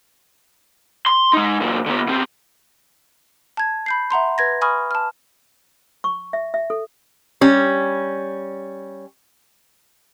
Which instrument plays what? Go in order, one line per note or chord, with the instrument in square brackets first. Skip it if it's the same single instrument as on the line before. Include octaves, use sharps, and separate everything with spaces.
[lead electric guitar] C6
G#3 D#4
A#2 F#3
D3 B3
B2 C4
[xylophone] A5 G#6
B5 G6 C7
E5 F#5 A#5 C6
B4 G#6 A#6
G#5 B5 C#6 D#6 F6
A5 F6
[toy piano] C#6
E5
E5
A4
[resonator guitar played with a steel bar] G3 C#4